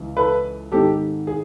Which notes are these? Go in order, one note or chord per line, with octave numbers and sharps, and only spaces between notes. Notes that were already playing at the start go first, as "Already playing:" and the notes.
Already playing: C#2 E3 C#4
A4 B4
G#2 D#3 G#3 C4 G4 A4
G#4